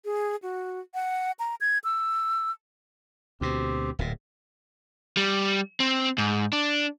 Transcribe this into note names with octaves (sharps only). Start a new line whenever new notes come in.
G#4
F#4
F#5
A#5
G#6
E6
D2 B2 C4 G4
D1 A#2
G3
C4
G#2
D4